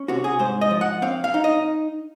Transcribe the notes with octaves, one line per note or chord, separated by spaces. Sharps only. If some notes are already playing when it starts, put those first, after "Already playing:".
Already playing: C#4
C3 F#4
G#4
G#2 C5
D#5
F3
F#5
C4 F5
F5
D#4
D#5